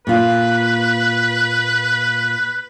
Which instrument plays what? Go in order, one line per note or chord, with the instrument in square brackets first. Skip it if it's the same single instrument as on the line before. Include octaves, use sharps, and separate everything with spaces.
[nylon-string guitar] A#2 F4 [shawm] B4